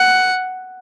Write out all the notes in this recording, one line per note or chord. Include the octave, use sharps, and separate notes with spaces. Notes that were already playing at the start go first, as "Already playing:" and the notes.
Already playing: F#5